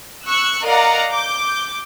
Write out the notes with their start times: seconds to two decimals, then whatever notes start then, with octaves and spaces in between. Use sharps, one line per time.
0.25 C#6 E6 F#6
0.64 A#4 D5 D#5 F5 F#5 A#5
1.11 D6 G6